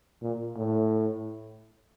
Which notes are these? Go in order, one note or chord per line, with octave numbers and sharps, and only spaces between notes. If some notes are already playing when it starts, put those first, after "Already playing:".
A#2
A2